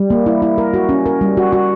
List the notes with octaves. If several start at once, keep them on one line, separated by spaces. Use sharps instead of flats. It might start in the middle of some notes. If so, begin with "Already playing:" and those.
Already playing: G3
A#3
E4
E4
A#4
F#4
C#4
A#4
G3
F#4
F#4